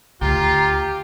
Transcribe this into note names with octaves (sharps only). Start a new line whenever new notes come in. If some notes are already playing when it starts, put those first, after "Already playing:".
D2 F4 G4 A#5